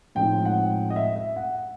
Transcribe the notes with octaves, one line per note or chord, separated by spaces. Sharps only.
A2 F3 G#3 C4 D#4 G5
F#5
D#5
E5
E5
F#5